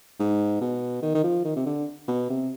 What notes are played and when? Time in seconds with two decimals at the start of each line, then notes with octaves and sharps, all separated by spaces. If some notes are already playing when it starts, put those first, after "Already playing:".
0.19 G#2
0.61 B2
1.02 D#3
1.15 D#3
1.23 F3
1.44 D#3
1.56 C3
1.66 D3
2.08 B2
2.30 C3